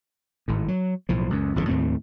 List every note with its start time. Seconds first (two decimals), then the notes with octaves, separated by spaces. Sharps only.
0.48 G#1 A2
0.68 F#3
1.09 B1 A2 F3
1.30 C#2 F#2
1.55 G1 E2 A#2 C#3
1.69 D#2 A2 A3 C4